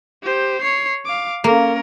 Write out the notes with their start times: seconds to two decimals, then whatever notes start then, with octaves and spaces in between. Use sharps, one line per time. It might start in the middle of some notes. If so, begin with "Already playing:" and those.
0.23 G4 C5
0.61 C#5 C7
1.05 F5 D6
1.44 A#3 C#4 A#4